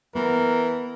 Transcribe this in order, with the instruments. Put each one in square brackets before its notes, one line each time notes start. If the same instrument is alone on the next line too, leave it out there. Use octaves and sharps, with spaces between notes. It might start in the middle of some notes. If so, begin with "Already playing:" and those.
[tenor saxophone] E3 [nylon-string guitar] B3 [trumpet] A#4